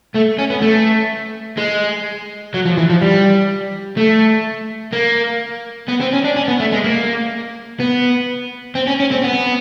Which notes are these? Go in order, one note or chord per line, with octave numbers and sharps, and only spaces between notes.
A3
C#4
B3
A3
G#3
F#3
F3
E3
F3
G3
A3
A#3
B3
C4
C#4
D4
C#4
B3
A3
G#3
A#3
B3
C4
C#4
C#4
C4
B3